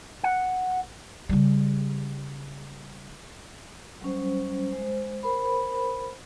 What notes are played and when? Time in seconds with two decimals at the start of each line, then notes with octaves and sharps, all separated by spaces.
0.24 F#5
1.29 C#3 G3
4.01 F#3 G3 C#4 C5
4.72 G#3 C5
5.23 A#4 C5 B5